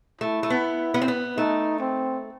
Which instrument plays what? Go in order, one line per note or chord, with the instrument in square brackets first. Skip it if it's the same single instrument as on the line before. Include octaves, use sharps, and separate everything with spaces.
[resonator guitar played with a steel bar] A3 [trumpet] E4
[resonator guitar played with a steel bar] A3
B3
B3
C4
B3
[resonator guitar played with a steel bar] A3 [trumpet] D#4
[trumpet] C4